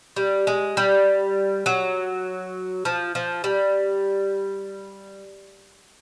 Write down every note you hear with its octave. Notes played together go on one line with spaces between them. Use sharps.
G3
G#3
G3
F#3
F3
F3
G3